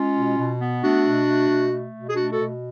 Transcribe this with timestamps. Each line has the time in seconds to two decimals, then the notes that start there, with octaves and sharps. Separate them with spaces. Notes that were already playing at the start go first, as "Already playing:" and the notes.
Already playing: G#3 C#4 F4
0.16 B2
0.38 B2
0.60 B3
0.83 A3 D4 F#4
1.04 B2
1.27 A3
1.48 B2
1.71 A3
1.94 B2
2.09 G#4
2.15 A3 D4 F#4
2.32 F#4 A4
2.38 B2